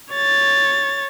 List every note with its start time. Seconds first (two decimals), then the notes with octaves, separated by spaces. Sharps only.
0.11 C#5 A6